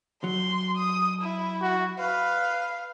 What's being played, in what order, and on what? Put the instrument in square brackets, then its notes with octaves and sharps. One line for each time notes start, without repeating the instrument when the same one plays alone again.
[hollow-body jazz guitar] F#3 [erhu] C6
[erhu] D#6
E4
[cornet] F#4
[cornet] B4 [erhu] F5